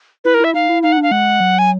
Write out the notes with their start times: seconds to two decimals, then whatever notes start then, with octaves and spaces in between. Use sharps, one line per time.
0.25 E4 B4
0.34 A#4
0.40 E4 E5
0.54 D#4 F5
0.69 E4
0.83 D#4 F5
0.92 F#5
0.97 D4
1.03 F5
1.11 G#3 F#5
1.40 F#3
1.59 G#5